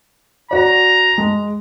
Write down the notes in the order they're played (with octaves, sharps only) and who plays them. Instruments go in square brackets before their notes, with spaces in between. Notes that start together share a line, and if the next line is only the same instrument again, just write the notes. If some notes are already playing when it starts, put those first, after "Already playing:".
[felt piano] F#4 D5 [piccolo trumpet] A#5
[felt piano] G#3